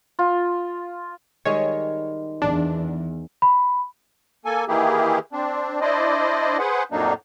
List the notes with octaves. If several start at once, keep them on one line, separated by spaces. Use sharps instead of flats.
F4
D#3 G3 G#3 C#5
E2 D4
B5
A#3 A4 G#5
D#3 E3 A#3 E4 G4 G#4
C4 D4
D4 E4 C5 D5 D#5
G#4 B4 C5 F#5
F2 A2 F#3 A#3 D4 D#4